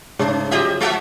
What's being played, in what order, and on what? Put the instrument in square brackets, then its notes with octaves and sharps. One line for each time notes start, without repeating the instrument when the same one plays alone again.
[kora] G#2 C#3 A3 [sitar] C#4
[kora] F3 F#3 C5 [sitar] G4 D#5 E5
[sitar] G#3 F#4 E5